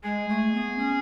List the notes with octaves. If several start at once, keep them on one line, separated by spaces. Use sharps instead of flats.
G#3 G#4
A3
B3
C#4